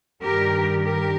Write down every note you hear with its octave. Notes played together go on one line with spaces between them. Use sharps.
G2 D#3 G4 A#4
G4 A#4